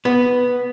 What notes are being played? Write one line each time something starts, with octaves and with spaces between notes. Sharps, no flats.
B3